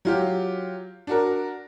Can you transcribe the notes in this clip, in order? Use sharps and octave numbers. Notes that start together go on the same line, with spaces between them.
F#3 F4 G4
D4 F#4 A#4